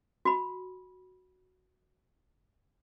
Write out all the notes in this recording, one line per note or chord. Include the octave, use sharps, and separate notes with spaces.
F#4 B5